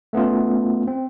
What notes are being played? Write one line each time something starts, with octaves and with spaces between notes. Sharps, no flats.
A3 B3 C#4 F4
C4